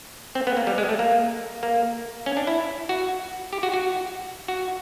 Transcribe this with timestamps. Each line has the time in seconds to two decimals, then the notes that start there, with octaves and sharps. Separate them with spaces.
0.35 C4
0.47 B3
0.57 A#3
0.67 G3
0.78 G#3
0.89 A3
0.99 A#3
1.63 A#3
2.26 C#4
2.37 D4
2.47 E4
2.89 F#4
3.53 G4
3.63 F#4
3.74 F#4
4.48 F#4